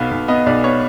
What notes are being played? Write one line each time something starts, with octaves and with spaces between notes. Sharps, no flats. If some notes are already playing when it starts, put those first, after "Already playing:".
Already playing: B1 B3 F5
B1
B3 D#5
B1 D5
B3 C#5